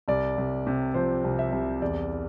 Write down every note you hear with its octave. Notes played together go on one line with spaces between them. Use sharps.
C2 D5
C2
C3
F3 C5
C2
E5
C2
E2 D5